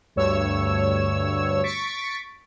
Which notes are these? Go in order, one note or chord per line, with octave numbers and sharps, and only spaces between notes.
D2 G2 C#5 E6
C#6 A6 B6 D7